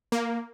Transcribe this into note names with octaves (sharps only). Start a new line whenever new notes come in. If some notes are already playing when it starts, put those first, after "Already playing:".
A#3